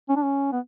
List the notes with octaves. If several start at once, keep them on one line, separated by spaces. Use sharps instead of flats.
C#4
D4
C#4
B3